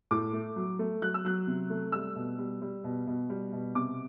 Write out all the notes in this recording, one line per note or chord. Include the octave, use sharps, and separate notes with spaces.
A2 D6
A3
F#3
A3
F#3 F#6
E6
F#3 F#6
C3
A3
G3 E6
B2
G3
G3
B2
B2
G3
B2
C3 D6